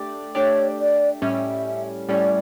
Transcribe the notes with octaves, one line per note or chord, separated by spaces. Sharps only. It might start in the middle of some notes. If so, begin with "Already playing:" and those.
Already playing: A3 D4 G4 D5
A3 D4 G4 C#5 D5
D5
A2 G3 C#4 E5
A2 G3 C#4 D5